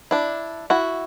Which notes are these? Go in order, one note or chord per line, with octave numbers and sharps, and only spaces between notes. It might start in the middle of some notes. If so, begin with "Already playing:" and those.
D4 E4
E4 F#4